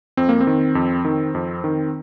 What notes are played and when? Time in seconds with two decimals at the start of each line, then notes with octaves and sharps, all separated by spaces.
0.17 F2 C4
0.29 A#3
0.41 C4
0.47 D#3
0.75 F2
1.05 D#3
1.35 F2
1.64 D#3